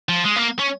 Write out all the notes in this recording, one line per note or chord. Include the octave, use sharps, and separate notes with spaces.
F3
G#3
A#3
C#4